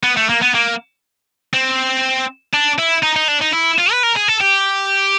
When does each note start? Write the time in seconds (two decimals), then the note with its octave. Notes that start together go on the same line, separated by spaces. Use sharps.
0.04 B3
0.17 A3
0.29 A#3
0.42 B3
0.55 A#3
1.54 C4
2.54 D4
2.79 E4
3.03 D#4
3.16 D#4
3.28 D4
3.41 D#4
3.53 E4
3.78 F4
3.92 B4
4.03 A#4
4.16 G#4
4.28 A4
4.41 G4